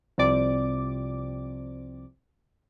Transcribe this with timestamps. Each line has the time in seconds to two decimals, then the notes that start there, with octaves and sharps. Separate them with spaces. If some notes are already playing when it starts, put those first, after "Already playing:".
0.18 C2 C3 F3 C4 D5 D6